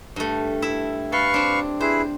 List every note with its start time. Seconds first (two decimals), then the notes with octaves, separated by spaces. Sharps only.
0.16 G2 A3
0.62 E4 E5
1.12 A4 B4 F5 C#6
1.34 C4 D4
1.81 E4 G#4 B4 C5